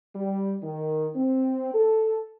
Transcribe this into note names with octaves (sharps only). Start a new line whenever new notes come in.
G3
D#3
C4
A4